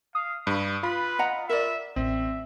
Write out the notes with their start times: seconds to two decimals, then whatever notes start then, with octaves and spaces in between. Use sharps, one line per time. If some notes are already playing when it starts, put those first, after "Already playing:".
0.15 F5 D#6
0.47 G2 B5
0.83 F4 B4 B5
1.19 D#5 F#5 A#5
1.49 A#4 D5 E5
1.96 A1 C4 E5